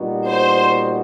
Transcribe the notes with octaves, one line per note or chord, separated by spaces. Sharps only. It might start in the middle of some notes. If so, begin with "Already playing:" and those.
Already playing: A#2 G3 B3 D#4 F#4
C5